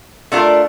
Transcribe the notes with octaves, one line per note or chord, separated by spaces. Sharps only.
A3 D4 F4 A#4